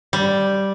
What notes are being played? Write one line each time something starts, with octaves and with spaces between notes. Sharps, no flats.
G3